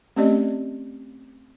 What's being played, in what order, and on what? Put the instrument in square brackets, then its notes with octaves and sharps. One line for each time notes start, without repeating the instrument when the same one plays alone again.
[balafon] A3 C4 C#4 G4 D5 D#5